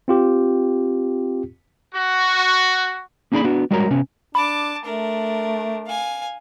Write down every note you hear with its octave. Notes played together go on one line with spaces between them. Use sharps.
C4 F4 G4
F#4
A#3 C#4 D#4 G#4 D5 B5
B3 D4 F#4
G3 G#3 F#4 A#4 C#5 A#5
C3 B3 C#4
D4 A5 B5 D6
A3 D4 A#4
F5 G#5